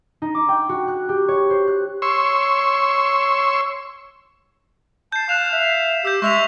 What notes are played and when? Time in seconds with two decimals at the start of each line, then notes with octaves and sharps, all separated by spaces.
0.22 D#4
0.35 D6
0.49 G5
0.69 F#4
0.88 F#6
1.09 G4
1.28 C#5
1.50 C5
1.68 F#6
2.02 C#5 C6 C#6 E6
5.12 A5 G6 C7
5.29 F5 F#6 E7
5.52 E5
6.05 G4 E6 G6
6.22 G#3 E5 C#6 E6 F7